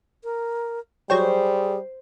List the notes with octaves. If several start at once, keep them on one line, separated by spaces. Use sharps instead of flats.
A#4
F#3 G3 G#4 C5 C#5 G5